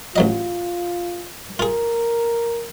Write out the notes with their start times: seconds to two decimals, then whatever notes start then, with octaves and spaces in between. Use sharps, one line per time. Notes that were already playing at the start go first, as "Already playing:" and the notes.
0.16 A1 F#3 F4 D#5
1.59 F4 G#4 A#4